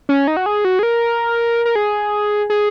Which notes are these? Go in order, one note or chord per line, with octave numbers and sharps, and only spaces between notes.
C#4
D#4
F#4
G#4
F#4
G#4
A#4
A#4
G#4
G#4